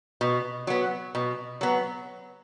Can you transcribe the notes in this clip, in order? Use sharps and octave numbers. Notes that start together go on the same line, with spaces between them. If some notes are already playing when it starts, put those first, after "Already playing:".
B2
F#3 B3
B2
F#3 B3